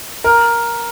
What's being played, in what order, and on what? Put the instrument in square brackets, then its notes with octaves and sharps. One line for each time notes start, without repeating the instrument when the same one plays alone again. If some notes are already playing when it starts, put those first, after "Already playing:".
[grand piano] A#4